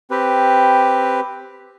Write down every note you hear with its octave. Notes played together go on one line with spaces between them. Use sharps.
C4 G4 B4